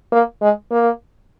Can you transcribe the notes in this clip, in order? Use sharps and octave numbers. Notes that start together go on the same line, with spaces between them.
A#3
G#3
A#3